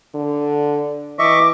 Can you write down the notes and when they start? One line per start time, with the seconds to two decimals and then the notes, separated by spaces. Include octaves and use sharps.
0.15 D3
1.19 E3 D#5 E5 C#6 D6